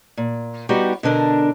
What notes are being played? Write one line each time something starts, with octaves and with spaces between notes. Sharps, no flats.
A#2
G3 B3 D#4 F#4 G4
B2 D3 D4 A#4